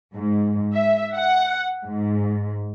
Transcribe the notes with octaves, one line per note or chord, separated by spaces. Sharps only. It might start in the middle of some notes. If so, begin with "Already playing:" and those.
G#2
E5
F#5
G#2